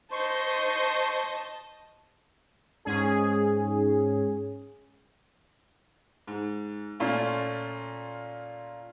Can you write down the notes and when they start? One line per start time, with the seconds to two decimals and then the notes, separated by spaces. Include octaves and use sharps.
0.11 C5 D#5 A5 C6 C#6
2.85 G#2 C#4 G#4
6.27 G#2
7.00 A#2 A3 C#4 F4